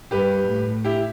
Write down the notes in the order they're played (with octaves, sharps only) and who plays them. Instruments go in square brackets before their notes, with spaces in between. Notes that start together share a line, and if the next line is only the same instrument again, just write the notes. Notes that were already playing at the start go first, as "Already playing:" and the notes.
[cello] G2 [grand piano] G4 B4
[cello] A2
[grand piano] E4 G4